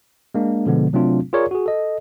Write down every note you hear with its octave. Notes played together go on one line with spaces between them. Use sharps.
G#3 A#3 D4
B2 D3 F3 G#3 B3
C3 F#3 A3 C4 D4 F4
F4 G#4 A#4 C#5 D5
F#4 G#4
A4 D#5